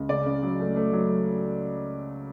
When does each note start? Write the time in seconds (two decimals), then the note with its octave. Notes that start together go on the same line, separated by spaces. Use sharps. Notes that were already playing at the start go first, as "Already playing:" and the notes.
Already playing: C#2
0.09 C#3 D5
0.26 C#3
0.43 F#3
0.60 A3
0.76 A3
0.93 F#3